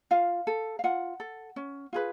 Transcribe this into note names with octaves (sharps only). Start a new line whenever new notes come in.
F4 F5
A4
F5
F4 F#5
A4
C#4
F4 G#4 B4